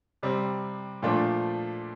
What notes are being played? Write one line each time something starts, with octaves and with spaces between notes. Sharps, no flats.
C3 G3 C4
A#2 F3 A3 D4 F4